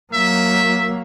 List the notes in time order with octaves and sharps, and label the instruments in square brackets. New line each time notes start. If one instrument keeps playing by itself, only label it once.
[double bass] F#3 A#3 [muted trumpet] E5